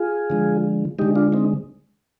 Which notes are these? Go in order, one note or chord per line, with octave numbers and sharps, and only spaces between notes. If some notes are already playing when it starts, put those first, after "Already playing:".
Already playing: F4 G#4
D3 F3 G#3
D3 G#3 D#4 G4
D4 F4
C4 D#4